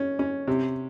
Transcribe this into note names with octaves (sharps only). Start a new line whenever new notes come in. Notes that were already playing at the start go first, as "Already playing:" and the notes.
Already playing: C#4
C#4
C3